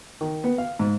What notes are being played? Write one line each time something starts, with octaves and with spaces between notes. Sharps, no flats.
D#3
B3
F5
G#2